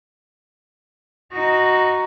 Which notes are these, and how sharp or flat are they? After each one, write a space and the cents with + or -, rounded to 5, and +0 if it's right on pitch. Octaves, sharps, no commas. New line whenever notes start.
D#4 +0 F#4 +0